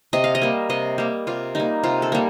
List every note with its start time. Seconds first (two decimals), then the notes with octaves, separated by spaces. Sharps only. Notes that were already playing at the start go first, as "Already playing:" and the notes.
0.13 C3 D#5
0.24 F5
0.35 D#5
0.42 G3 A#3
0.69 C3 D#5
0.98 G3 A#3
1.27 C3 F4
1.55 G3 A#3 D#4
1.83 C3 F4
2.02 A4
2.12 G3 A#3